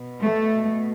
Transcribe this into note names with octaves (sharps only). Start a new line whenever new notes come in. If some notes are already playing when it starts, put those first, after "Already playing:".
Already playing: B2
A3